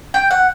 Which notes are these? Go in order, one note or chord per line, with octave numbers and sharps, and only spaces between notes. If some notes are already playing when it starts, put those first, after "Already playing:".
G5
F#5